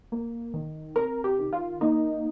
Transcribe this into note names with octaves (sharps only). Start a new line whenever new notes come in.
A#3
D#3
C3 A#4
G4
D#3
F4
A#3 D#4